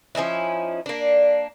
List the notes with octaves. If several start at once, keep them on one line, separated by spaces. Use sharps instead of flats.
F3 C#4 D#4 E4
A#3 D4